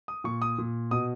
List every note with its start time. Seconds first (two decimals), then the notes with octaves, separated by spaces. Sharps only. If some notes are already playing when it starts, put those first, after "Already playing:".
0.08 D#6
0.24 A#2 C#6
0.42 D#6
0.58 A#2
0.91 B2 D#6